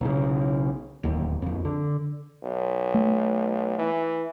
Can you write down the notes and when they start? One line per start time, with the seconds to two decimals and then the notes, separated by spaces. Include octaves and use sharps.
0.01 B1 C#3
1.03 D1 D#2
1.42 A#1 F2
1.65 D3
2.43 B1
2.94 A3
3.78 E3